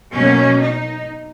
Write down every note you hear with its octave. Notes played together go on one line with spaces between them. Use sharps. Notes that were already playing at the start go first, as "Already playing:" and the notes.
B2 F#3 A#3 C#4
D#4